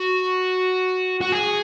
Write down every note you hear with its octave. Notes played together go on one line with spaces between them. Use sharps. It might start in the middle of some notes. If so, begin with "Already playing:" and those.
Already playing: F#4
F#4
G#4